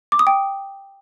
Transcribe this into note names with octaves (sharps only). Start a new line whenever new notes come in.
D6
D#6
G5